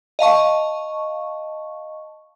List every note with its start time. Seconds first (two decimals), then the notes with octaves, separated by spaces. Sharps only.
0.19 D#5 F5 A5 C#6